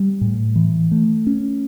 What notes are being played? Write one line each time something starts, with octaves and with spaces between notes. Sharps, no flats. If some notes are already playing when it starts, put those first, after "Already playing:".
Already playing: G3
A2
E3
A3
C#4